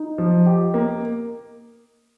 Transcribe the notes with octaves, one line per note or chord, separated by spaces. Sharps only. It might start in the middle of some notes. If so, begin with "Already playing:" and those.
Already playing: D#4
F3
G4
A#3